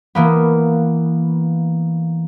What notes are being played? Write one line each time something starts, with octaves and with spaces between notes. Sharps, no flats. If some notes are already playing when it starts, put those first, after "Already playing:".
E3 A#3 B3